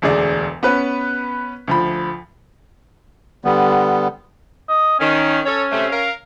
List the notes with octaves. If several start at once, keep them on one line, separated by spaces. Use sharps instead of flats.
E1 D2 G#4 D5
B3 C#4 B4
D2 F3 B5
D3 G3 B3
D#5
D#3 C#4
C#4 A4 C#5
C3 A3
A#4 F5